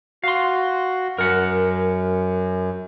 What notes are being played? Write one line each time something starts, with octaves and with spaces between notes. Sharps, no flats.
F#4 F5 C6
F#2 A#4 F#5